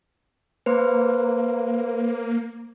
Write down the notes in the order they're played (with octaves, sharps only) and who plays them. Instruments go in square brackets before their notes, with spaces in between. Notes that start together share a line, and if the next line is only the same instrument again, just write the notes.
[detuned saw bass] A#3 [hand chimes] B4 C5